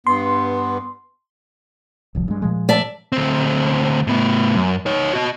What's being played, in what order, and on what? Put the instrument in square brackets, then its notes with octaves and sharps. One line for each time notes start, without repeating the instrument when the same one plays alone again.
[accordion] G2 B3 [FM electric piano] C6
[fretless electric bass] D1 C2 F3
G2 G#3
A#2 F3 G#3
[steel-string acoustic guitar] D5 E5 A5
[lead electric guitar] D2 C4
A2 B3
F#2
D#4 C#5
F#4 D#5